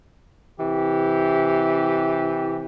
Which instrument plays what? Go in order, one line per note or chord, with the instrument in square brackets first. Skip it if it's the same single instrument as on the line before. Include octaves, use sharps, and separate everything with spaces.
[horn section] C3 E3 G4